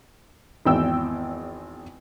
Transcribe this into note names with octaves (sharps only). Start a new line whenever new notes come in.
G#1 E2 G5 E6